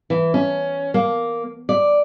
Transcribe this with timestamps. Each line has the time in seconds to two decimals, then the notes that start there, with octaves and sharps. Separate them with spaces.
0.10 E3
0.34 C#4
0.94 A#3
1.69 D5